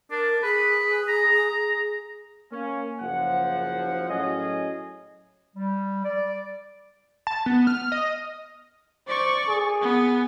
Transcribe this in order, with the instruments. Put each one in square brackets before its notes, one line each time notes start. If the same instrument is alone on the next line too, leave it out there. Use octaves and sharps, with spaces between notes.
[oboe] D4 [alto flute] A#4
[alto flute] G#4 [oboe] B4
[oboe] A#5
[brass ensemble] A#3 C#4
F#1 F3 F#5
A2 F#3 C#4 G#4 D#5
[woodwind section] G3
D5
[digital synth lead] A5
B3
F6
D#5
[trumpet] C5 [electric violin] D5 C#6
[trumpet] G#4
[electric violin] B3